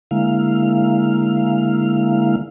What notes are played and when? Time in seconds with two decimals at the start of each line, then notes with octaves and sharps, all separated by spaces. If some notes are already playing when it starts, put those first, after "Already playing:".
0.11 D3 G#3 A#3 E4 F5